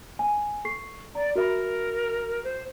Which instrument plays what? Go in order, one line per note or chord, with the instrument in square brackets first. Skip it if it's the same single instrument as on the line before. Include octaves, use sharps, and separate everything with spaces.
[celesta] G#5
A4 C#6 C7
[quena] D5 [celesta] A#5
[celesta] F#4 E5 B5 [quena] A#4
[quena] C5